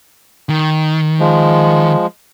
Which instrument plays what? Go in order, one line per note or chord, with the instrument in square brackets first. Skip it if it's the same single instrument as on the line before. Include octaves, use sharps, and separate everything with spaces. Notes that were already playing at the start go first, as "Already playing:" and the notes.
[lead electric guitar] D#3
[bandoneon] F3 G#3